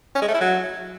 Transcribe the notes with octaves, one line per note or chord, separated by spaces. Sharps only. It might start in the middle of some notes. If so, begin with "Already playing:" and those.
C#4
G#3
A3
E4
F#3